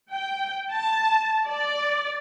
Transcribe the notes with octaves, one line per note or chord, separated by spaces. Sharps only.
G5
A5
D5